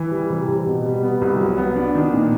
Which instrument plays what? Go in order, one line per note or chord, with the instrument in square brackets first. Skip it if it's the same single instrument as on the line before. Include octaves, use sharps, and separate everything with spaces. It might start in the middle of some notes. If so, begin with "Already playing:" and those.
Already playing: [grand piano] E3
G3
C3
C3
B2
G3
B3
C2
F#3
B3
D4
D#3
A#2